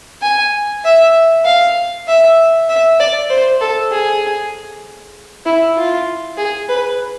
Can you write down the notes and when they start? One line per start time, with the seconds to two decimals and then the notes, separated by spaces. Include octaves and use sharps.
0.22 G#5
0.84 E5
1.45 F5
2.08 E5
2.69 E5
3.00 D5
3.30 C5
3.61 A4
3.91 G#4
5.46 E4
5.77 F4
6.37 G#4
6.68 B4